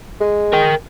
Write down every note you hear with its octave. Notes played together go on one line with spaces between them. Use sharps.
G#3
A#4 G5